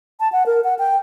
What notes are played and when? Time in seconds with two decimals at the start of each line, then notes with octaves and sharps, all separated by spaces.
0.20 A5
0.32 F#5
0.46 A#4
0.64 F#5
0.79 G5